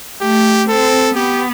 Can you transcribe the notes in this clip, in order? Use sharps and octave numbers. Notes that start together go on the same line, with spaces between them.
A3 G4
C4 A4
B3 G4